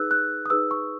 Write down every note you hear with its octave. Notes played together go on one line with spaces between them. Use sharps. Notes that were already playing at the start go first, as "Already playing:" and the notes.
Already playing: D#4 G#4 B4 E6 F#6
F#6
D#6
D#4 G#4 B4 E6
C#6